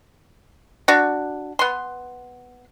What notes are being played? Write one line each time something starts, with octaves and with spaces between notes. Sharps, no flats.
D4 F#4
B3 C6